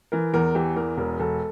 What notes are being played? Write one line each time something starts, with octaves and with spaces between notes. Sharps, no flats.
E3 A#4
E2 A#4
E3 G4
E2 A#4
E1 A#4
E1 A4